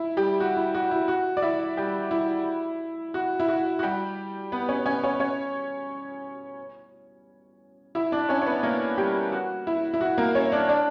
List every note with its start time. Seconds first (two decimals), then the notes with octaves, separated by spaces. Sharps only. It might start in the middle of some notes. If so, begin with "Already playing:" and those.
Already playing: E4
0.17 G3 G4
0.40 F#4
0.57 E4
0.75 F#4
0.91 E4
1.08 F#4
1.37 D5
1.42 E4 E5
1.77 G3 G4
2.11 E4
3.14 F#4
3.40 E4
3.48 F#4
3.79 F#4
3.83 G3 G4
4.52 B3 B4
4.69 C#4 C#5
4.86 C#4 C#5
5.03 C#4 C#5
5.20 C#4 C#5
7.95 E4 E5
8.12 D4 D5
8.29 C#4 C#5
8.42 C#5
8.46 B3 B4
8.63 A#3 A#4
8.98 G3 G4
9.32 F#4
9.67 E4
9.94 E4
10.01 F#4
10.18 A#3 A#4
10.35 C#4 C#5
10.52 D4 D5
10.69 D4 D5